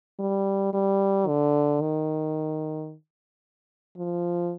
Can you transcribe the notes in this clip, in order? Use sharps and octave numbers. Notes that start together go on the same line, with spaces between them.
G3
G3
D3
D#3
F3